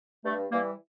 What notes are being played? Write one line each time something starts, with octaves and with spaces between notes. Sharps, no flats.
G2 A3
E3 G3 A#3